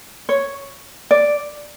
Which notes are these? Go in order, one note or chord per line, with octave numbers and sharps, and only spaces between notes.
C#5
D5